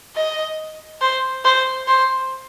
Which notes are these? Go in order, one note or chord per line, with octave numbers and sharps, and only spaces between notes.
D#5
C5
C5
C5